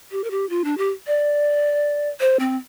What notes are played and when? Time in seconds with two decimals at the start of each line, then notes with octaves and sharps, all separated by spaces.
0.11 G4
0.24 A#4
0.31 G4
0.50 F4
0.65 D4
0.78 G4
1.07 D5
2.20 C5
2.39 C4